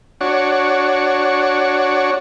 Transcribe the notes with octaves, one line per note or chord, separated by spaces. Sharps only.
D4 F#4 C#5